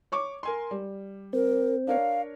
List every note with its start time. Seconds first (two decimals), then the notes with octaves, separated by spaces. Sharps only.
0.12 C#5 C#6 D6
0.43 A#4 G#5 C6
0.71 G3
1.33 C4 A#4
1.87 D4 A#4 C#5 F5